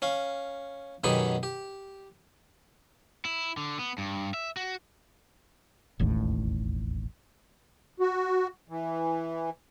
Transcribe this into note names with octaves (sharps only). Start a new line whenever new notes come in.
C#4 F5
F#2 B2 D#3 G4 G#4 B5
G4
E4
D3
B3
G2
E5
F#4
E1 A1 D#2 A2
F#4
E3